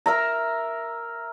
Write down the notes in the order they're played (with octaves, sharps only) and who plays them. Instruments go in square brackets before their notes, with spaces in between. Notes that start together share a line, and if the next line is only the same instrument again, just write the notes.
[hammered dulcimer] A#4 E5 A#5